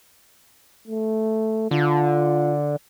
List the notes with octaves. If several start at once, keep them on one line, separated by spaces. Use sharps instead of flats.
A3
D3 F4